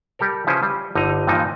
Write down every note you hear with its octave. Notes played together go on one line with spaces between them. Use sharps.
G3 G4 A4 A#4
C#3 F3 C#4 E4 B4 C5
G3
G1 D3 D#4 D#5 A#5
G2 A#2 E3 F3 D#4